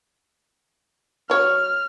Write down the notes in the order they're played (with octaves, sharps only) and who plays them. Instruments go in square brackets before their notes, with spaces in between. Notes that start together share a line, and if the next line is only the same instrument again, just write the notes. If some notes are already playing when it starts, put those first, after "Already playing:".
[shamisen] F#3 C#5 [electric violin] F6